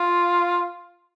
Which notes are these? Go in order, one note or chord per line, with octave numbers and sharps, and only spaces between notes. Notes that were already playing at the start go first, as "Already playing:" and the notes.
Already playing: F4